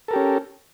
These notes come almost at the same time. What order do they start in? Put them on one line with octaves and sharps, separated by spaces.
A4 A#4 G4 C#4